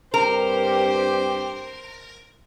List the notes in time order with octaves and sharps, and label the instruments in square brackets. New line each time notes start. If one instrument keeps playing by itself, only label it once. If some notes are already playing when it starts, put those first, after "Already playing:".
[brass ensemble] G2 C4 G4 [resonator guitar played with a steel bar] A#4 [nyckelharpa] C5